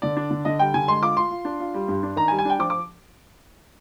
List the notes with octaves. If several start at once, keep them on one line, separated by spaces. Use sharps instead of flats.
D3 D5
D4
D3
D3 D#5
G3 G5
D3 G#5
G#3 C6
F4 D6
F4 C6
F4
D4
F4
G3
G2
D4
D#3 A#5
G#5
G3
G#5
D4 G5
F3 D6
D6